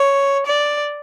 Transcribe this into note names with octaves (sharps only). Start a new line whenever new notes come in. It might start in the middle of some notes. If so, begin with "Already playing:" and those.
Already playing: C#5
D5